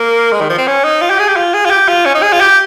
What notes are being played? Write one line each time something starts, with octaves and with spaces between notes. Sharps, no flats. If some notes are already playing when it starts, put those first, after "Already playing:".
Already playing: A#3
G#3
D#3
F3
C4
C#4
D#4
F4
G4
G#4
G4
F4
G#4
F4
G4
F4
C#4
D#4
G#4
F4
G4